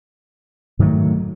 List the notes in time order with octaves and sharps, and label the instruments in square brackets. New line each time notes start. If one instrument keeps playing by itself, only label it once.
[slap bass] G#2 D#3 F#3 A3